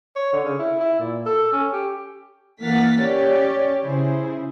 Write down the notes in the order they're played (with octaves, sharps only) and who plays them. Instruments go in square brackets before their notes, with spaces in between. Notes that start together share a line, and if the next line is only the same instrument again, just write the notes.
[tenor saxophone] C#5
D3
C#3
E4
E4
A#2
A4
C#4
G4
[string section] E3 A#3 F#5 F6 A6 B6
C#4 G4 C#5 D5
C#3 E4 G#4 C5